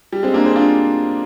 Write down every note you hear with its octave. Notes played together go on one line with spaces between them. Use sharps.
G3
G#3 C4
A#3 D4
G#4 C5
D4 F4